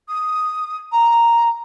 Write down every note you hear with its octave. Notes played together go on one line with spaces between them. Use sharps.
D#6
A#5